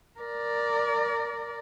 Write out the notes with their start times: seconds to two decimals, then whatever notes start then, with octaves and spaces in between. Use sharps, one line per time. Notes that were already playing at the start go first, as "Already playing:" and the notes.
0.20 A#4 D5